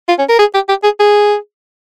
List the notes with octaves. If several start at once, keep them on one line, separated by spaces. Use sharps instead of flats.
F4
C#4
A#4
G#4
G4
G4
G#4
G#4